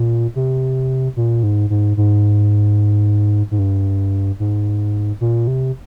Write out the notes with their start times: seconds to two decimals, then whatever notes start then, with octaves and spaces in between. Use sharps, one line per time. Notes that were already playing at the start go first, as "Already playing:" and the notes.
Already playing: A#2
0.36 C3
1.17 A#2
1.43 G#2
1.70 G#2
1.97 G#2
3.51 G#2
3.59 G2
4.40 G#2
5.21 A#2
5.47 C3